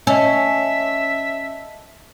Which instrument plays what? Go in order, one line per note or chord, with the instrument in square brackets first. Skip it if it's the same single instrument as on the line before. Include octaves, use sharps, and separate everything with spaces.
[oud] C#4 [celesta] D#5 A5 E6 [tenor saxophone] E5